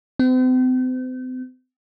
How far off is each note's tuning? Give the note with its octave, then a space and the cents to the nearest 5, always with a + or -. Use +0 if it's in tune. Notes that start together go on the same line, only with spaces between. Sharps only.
C4 -40